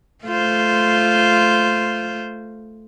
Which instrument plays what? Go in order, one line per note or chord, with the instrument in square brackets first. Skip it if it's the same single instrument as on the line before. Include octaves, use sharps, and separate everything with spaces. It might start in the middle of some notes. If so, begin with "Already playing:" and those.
[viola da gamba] A3 F4 C5